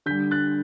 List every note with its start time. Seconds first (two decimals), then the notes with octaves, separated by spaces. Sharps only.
0.06 D3 G6 B6
0.11 G3
0.31 F#6 A6